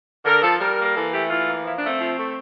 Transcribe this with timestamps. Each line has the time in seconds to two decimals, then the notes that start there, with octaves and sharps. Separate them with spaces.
0.25 D3 A#4
0.42 F3 A4
0.59 G3 A#4
0.77 A#3
0.85 A#4
0.95 E3 A4
1.12 A3 G4
1.30 E3 F4
1.47 A#3
1.64 F3 E4
1.77 D4
1.83 A3
1.88 C4
2.00 F3
2.17 A3